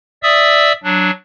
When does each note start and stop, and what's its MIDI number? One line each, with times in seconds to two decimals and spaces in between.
0.23 0.73 74
0.23 0.73 76
0.23 0.73 87
0.23 0.73 88
0.84 1.11 54
0.84 1.11 62